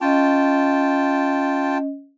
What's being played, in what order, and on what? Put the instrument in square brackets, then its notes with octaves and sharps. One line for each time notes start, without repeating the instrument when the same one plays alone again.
[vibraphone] C#4 D#5 [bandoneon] F4 G5 A5